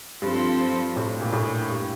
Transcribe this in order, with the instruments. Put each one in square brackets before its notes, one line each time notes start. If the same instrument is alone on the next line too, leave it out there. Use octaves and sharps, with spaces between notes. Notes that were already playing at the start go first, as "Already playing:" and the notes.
[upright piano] G2 [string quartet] F3 C4 F4 A4 C5
[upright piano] A2
A#2
A2
G2